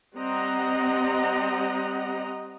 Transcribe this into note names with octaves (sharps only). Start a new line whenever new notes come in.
G3 C4 D#5 F#5 A#5